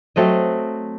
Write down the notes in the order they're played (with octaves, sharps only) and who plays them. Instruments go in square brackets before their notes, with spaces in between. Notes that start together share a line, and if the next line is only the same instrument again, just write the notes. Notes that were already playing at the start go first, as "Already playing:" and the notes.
[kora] F#3 A3 C4 D#5